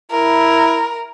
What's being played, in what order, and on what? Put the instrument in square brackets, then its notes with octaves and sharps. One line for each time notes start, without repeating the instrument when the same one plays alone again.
[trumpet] E4 [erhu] A#4